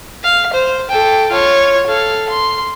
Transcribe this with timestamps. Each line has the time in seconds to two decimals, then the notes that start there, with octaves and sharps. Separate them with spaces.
0.23 F5
0.53 C5
0.89 A4 G5
1.31 F4 C#5
1.86 A4 F5
2.29 C6